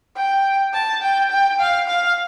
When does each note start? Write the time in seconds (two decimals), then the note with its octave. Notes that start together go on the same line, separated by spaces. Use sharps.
0.16 G5
0.74 A5
1.02 G5
1.31 G5
1.60 F5
1.88 F5